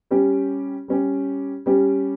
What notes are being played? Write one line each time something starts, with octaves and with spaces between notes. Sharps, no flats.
G3 C#4 G4
G3 C#4 G4
G3 C#4 G4